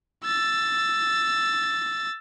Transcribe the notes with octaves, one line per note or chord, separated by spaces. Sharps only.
E6 A6